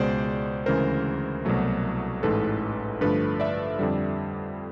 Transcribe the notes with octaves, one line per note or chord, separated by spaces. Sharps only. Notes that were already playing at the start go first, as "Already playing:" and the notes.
Already playing: C#2 B2 G#3 C5 D5
D2 C#3 E3 G#3 A#4 C5
C2 B2 F#3 A3
A1 G#2 E3 A3 A4 B4
G2 D3 F3 A3 A4 B4
D5 E5
F2 D3 G3